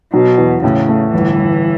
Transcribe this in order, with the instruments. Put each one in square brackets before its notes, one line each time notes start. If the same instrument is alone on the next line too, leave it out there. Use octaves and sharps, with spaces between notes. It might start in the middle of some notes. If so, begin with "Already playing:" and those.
[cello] B2 [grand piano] F#3
[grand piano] E2
[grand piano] A2 [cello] C#3
[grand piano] A3
[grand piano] G1 [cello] E3
[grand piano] G1